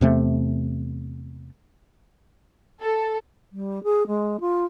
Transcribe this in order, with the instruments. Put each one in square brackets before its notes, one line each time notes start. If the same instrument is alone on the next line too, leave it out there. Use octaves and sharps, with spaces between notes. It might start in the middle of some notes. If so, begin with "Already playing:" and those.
[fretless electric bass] E2 C3 A3
[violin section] A4
[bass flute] G3
G#4
G#3
F4